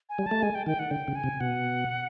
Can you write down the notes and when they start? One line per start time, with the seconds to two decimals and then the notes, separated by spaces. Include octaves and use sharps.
0.09 G#5
0.19 G3
0.26 A3 A5
0.42 G#3 G#5
0.55 G5
0.66 D#3 G5
0.79 F#5
0.91 D3 G5
1.08 C#3
1.15 G#5
1.24 C3
1.40 B2 F#5